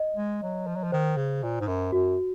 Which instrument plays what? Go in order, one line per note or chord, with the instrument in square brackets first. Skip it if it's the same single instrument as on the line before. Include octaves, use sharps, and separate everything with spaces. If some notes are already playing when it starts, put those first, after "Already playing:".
Already playing: [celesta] D#5
[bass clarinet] G#3
F#3
F3
F#3
F3
[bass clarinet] D#3 [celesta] C5
[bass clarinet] C#3
A#2
G#2
F#2
[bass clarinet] F#2 [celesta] F#4